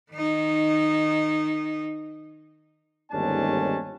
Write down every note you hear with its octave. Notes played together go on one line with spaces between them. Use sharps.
D#3 D#4
G1 D#2 G#2 C#4 D4 A5